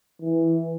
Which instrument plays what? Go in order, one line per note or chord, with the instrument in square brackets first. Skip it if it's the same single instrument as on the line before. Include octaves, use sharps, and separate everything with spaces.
[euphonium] E3